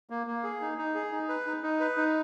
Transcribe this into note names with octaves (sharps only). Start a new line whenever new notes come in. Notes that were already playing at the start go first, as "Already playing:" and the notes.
A#3
A#3
G#4
D#4
D#4
G#4
D#4
B4
D#4
D#4
B4
D#4